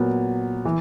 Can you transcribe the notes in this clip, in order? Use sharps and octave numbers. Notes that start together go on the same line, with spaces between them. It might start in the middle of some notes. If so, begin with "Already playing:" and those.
Already playing: A#2 F#3 B3
E3